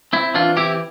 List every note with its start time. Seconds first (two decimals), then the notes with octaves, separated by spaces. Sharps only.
0.13 C4 E4
0.34 E3 D4 F4
0.57 C4 E4 G4